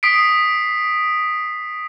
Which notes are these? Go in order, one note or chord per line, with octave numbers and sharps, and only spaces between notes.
D#6 B6 C7 D7